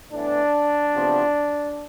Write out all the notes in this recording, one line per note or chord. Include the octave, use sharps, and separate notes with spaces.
A2 E3 B3 D4
E2 C3 F3 B3